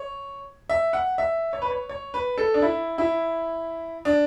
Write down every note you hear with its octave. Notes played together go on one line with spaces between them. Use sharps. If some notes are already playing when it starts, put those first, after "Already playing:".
Already playing: C#5
E5
F#5
E5
C#5
B4
C#5
C#5
B4
A4
D4
E4
E4
D4